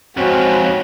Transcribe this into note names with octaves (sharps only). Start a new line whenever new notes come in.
F2 G#2 C4 C#4 F#4 C#5